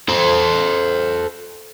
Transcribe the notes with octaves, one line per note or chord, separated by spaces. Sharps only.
A4 C5